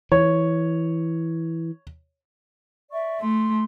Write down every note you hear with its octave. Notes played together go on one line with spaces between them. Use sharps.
E3 C#5
D5 E5 C#6
A3 C6